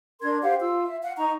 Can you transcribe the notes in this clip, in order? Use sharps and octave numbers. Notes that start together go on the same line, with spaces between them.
D4 A#4 C6 G#6
G4 C5 F5 F#5
F4 E6
E5
F5 F#5
D#4 A#5 C#6